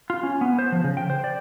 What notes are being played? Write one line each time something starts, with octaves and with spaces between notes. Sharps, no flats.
F4
C#4
B3
C5
F3
C#3
G5
C5
D5